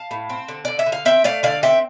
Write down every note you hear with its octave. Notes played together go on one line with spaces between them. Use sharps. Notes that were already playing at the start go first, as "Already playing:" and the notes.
Already playing: F5 A5
A2
C4
D3
D3 D5
E5
D3
F5
C4 E5 G5
A3 D5 F5
D3 D5 F5
C4 E5 G5